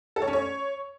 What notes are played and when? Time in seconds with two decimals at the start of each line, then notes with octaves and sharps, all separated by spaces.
0.16 A4
0.22 C#5
0.28 C#4
0.33 C#5